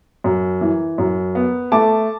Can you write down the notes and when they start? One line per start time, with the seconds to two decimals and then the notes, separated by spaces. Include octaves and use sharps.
0.24 F#2
0.61 E3
0.98 F#2
1.35 B3
1.72 A3 A5 D6